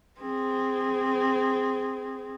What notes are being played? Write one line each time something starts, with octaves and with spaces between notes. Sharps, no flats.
C4 G#4